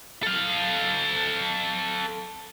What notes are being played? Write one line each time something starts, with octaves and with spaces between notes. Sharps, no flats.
A4 F5